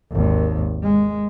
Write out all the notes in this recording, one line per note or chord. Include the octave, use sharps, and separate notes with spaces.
G#1 D#2
G#3